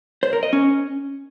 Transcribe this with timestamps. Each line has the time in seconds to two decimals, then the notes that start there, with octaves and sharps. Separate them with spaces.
0.23 C5
0.33 A#4
0.43 D#5
0.53 C#4